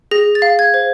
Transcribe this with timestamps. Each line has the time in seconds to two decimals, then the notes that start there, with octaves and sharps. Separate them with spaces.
0.11 G#4 A#6
0.35 A6
0.42 F5
0.59 G#6
0.74 C5